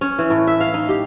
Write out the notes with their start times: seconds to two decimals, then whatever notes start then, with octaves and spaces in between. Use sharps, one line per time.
0.01 C#4
0.19 E3
0.30 A2
0.47 E5
0.60 F5
0.74 D#4
0.89 G4